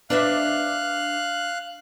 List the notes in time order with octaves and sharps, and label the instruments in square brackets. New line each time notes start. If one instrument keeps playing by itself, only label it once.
[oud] D4 B4 E5 [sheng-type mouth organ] F5 F#6